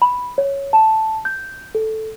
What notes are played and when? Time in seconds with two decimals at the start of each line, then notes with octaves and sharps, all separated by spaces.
0.02 B5
0.38 C#5
0.73 A5
1.25 G6
1.75 A4